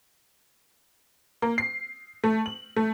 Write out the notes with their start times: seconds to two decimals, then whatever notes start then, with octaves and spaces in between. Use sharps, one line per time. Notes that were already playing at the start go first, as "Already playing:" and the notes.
1.42 A#3
1.58 C7
2.24 A3
2.46 F#7
2.76 A3